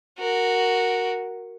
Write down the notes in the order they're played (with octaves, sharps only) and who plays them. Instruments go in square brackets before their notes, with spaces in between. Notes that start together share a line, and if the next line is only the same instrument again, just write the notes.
[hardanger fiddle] F#4 A#4